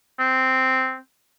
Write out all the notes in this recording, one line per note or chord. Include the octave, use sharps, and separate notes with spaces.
C4